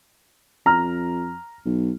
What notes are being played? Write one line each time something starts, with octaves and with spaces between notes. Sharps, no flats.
F2 A#5 F6
B1